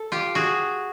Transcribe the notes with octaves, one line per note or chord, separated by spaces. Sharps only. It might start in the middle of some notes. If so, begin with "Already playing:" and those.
Already playing: A4
F4 G4
F#4 G#4